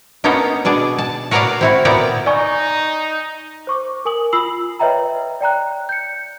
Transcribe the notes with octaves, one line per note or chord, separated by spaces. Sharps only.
A#3 B3 C#4 D#4 A4 A#4
B2 D4 G#4 D5
A5
F#4 A#4 B4 C#5 D5 F5
C4 E4 F#4
A#2 B3 E4 A#4 D5 G5
D#4 D5 G#5 C#6
C5 C#6 D6
A#4 G#5 D#6 F#7
F4 B5 E6 C7 F#7
B4 C#5 D#5 E5 G5 A#5
D5 G5 A#5 F#6
G6 C#7